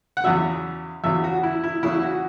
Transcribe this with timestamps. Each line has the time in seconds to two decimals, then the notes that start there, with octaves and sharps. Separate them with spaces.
0.17 F#5
0.24 E2 C#3 F#3 E5
1.04 E2 C#3 F#3 E5
1.24 F#4
1.43 E4
1.64 E4
1.83 E2 C#3 F#3 E4
2.03 F#4